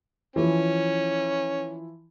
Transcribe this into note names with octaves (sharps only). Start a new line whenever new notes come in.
E3 F3 C#4